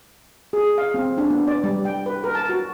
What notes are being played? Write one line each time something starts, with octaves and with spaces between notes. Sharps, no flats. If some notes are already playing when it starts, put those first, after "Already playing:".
G#4
F5
C4
D4
B3
D5
G3
G5
B4
A#4
A5
F#4